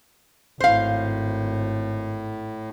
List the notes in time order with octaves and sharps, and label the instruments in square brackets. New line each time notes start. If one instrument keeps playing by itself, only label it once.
[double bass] G#1 [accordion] A2 [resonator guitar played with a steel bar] C5 F5